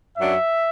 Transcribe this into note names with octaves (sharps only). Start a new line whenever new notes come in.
F#2 F#3 D4 E5